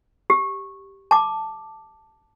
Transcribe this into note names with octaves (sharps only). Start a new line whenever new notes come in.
G4
A5 D6